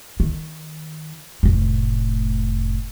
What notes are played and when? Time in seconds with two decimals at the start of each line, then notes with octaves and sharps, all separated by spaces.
0.20 D#3
1.43 F1 A2